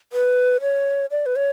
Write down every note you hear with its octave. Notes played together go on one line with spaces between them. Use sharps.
B4
C#5
D5
B4
C#5